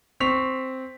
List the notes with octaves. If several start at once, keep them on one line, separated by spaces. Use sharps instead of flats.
C4 C#6 B6 F7